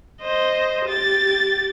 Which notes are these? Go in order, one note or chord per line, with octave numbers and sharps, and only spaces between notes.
C5 D#5
G4 A6